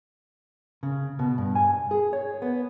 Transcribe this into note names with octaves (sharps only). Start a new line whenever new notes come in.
C#3
B2
G2
G#5
G#4
C#5
B3